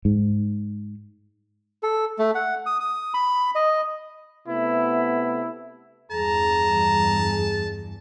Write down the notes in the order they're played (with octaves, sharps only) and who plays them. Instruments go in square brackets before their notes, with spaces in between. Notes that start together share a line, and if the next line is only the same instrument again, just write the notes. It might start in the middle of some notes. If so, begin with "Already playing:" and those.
[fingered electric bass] G#2
[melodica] A4
A3
F#5
D#6
D#6
B5
D#5
[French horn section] C3 A3 B3 [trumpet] E4
[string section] E2 G2 [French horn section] G#4 [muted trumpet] A5 [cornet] A#5